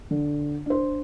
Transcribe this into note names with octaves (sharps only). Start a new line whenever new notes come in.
D3
D4 C5